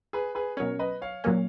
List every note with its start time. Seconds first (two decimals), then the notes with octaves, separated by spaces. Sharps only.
0.13 G#4 B4
0.35 G#4 B4
0.57 B2 F#3 C#4 A#4 C#5
0.79 B4 D#5
1.02 C#5 F5
1.24 A#2 F#3 A#3 C#4